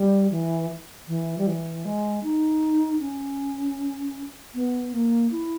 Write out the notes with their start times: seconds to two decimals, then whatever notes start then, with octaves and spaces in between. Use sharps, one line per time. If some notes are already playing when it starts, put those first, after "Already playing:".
Already playing: G3
0.31 E3
1.08 E3
1.38 G3
1.47 E3
1.85 G#3
2.24 D#4
3.00 C#4
4.55 B3
4.93 A#3
5.31 E4